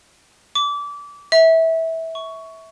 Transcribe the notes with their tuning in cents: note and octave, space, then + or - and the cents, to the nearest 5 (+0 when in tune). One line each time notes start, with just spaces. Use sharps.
D6 -25
E5 -20
C#6 +15